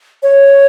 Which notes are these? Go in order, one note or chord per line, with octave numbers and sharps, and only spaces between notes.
C#5